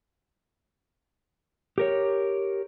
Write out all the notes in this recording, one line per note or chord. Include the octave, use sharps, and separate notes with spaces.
G4 A#4 C#5